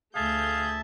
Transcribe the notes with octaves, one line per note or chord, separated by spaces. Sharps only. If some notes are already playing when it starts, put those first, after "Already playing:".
D2 A3 G#4 E5 F5 A5 G6